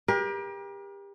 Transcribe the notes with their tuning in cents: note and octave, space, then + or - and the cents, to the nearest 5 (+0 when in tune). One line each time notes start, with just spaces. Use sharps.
G4 +30 A#4 +40